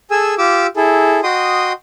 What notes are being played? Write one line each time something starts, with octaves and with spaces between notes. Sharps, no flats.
G#4 A4 G#5 E6
F4 G4 D6 E6
E4 G#4 A4
F#4 D#5 G5 C6 D#6